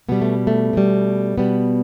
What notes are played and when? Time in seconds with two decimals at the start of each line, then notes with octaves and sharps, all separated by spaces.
0.09 B2 G3 B3
0.21 A3
0.47 A3
0.73 B2 G3
1.38 B2 G3 B3